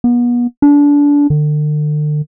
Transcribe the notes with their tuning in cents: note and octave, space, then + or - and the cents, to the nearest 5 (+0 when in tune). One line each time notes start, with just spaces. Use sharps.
B3 -35
D4 -25
D3 +40